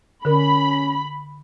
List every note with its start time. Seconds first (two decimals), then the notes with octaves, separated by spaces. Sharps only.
0.25 D3 C#4 A#4 B5